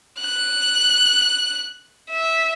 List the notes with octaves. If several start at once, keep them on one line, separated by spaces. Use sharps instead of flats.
F#6
E5